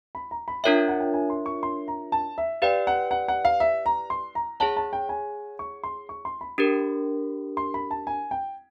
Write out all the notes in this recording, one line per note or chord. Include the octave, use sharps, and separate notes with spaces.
B5
A#5
B5
D4 F4 A#4 C#5 E5 G5
F#5
G5
G#5
C6
C#6
C6
A#5
A5
E5
G4 B4 D5 F5 G5
F#5
F#5
F#5
F5
E5
A#5
C6
A#5
G#4 C#5 F#5 A5
A5
G5
G#5
C#6
C6
C#6
C6
B5
D4 G4 A#4
C6
B5
A5
G#5
G5